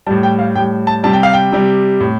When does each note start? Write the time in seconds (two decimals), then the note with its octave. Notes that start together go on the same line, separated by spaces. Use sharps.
0.07 A2 G3 A5
0.23 G5
0.39 F5
0.55 A2 G3 G5
0.87 A5
1.03 C3 G3 A5
1.13 G5
1.23 F5
1.33 G5
1.52 C3 G3
2.00 A2